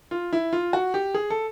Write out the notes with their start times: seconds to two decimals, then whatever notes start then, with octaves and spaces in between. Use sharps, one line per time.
0.11 F4
0.33 E4
0.53 F4
0.73 F#4
0.94 G4
1.14 G#4
1.30 A4